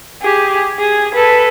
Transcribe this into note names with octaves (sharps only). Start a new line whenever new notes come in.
G4 G#4
G#4
A4 B4